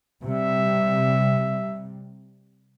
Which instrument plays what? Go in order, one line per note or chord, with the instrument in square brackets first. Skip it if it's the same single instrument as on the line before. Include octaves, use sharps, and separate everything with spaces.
[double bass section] C3 G3 [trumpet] E5